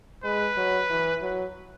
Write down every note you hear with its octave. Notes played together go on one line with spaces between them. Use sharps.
G#3 B4
F#3
E3
F#3